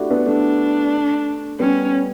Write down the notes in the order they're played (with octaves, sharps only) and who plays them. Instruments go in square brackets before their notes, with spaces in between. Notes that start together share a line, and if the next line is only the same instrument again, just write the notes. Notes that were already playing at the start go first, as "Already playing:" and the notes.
Already playing: [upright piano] A3 D4 E4 F#4 G4
B3 D4
[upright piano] A3 [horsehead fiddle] D4
[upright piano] G3 B3 [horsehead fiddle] C#4